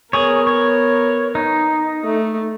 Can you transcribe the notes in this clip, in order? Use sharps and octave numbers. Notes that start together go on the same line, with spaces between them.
B3 G#4 A#4 C#5
C#5
D#4
A3